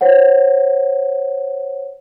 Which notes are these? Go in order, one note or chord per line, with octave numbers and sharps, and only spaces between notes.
C5 C#5 F#5